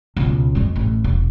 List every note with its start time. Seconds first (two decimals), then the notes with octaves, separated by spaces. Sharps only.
0.16 C#2 B2
0.55 F2 G#3
0.76 A1
1.04 E1